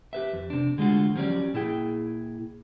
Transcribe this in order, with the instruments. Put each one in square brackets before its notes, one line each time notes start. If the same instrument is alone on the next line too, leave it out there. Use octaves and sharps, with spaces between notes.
[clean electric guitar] G4 B4 E5
F2
C3 D4
D3 G#3 A3 F4 F#4
F3 F#3 C#4 G4 D5
A#2 E4 G#4 G5